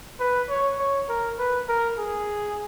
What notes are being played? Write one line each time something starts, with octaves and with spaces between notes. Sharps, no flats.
B4
C#5
C#5
A#4
B4
A#4
G#4